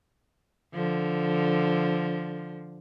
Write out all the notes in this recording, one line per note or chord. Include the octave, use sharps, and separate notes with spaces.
D3 F3